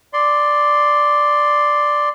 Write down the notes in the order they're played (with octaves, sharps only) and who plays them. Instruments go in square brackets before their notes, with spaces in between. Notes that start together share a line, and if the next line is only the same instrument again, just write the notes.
[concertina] D5 C6